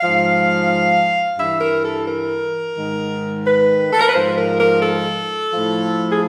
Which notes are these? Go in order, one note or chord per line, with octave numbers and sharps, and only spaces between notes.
G#2 F3 F5
G2 E3 E5
A#4
A4
A#4
G#2 D#3
B4
A4
A#4
B4
G#2 F3 C5
A#4
A#4
A4
A2 F3
G#4